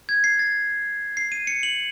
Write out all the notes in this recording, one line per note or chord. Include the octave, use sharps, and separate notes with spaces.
G#6
C7
A6
C7
D#7
C#7
F#7